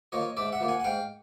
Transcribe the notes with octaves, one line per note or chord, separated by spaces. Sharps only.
F3 A#3 C#5 D#5
G#2 D5 E5
E5 F#5
F3 A#3
F#5 G#5
F#5
G#2 F5 G5